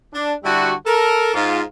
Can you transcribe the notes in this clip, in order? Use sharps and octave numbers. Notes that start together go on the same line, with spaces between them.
D4
D3 G3 E4 F#4
A4 A#4
G#2 F4